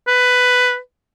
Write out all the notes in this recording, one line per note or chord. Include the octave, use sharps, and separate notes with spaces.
B4